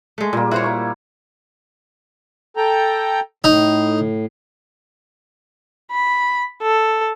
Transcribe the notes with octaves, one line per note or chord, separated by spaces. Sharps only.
G#3 A3
A#2 G3 A#3
E4 F#4 C5 C#5
A#3 C#6
A4 G5 A#5
A2 D#4
B5
A4